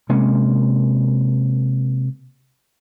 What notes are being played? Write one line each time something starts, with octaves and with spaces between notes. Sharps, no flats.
C3 G#3 A#3 C#4